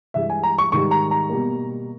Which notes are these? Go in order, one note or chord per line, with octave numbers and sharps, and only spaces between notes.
G2 E3 G#3 E5
G#5
A#5
C#6
G#2 D#3 G3 C#6
A#5
A#5
B2 G3 A#3